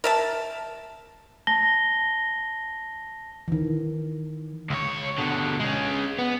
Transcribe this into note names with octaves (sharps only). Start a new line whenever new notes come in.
A#4 E5 A5
A5 A#6 G7
D#3 E3
C#2 C#5
B2 D3
G#3 C#4
B3